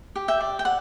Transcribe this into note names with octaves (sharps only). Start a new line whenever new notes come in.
G4
E5 G5
D5
G5
D5 F#5